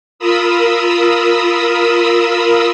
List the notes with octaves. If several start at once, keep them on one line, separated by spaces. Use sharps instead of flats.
F4 A#4 B5 D#6 E6